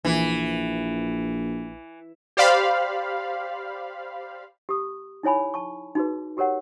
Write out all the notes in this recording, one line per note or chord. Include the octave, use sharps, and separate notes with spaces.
A#1 E3
G4 C5 D5 F5 B5
G4 D#6
D#4 E4 C#5 G#5 B5
A5 C#6
D#4 F#4 G#4 B4
F#4 G4 A#4 C#5 F#5